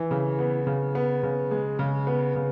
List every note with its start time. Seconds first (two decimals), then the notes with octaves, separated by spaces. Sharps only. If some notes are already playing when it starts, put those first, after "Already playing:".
Already playing: E3
0.11 C#3
0.39 B3
0.67 C#3
0.95 B3
1.23 C#3
1.51 G#3
1.79 C#3
2.07 B3
2.35 C#3